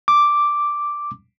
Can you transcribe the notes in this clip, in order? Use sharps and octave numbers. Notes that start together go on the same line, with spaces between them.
D6